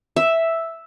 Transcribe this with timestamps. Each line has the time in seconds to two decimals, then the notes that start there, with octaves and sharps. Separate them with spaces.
0.16 E5